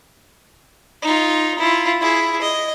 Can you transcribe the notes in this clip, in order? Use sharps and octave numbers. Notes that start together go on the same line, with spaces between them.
D#4 F4
E4 F4
E4 G#4
D#5